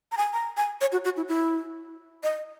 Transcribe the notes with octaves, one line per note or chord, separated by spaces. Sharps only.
A#5
G#5
A#5
G#5
C#5
F#4
F#4
E4
E4
D#5